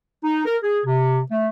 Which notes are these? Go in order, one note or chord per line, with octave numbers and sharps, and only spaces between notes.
D#4
A#4
G#4
C3
A3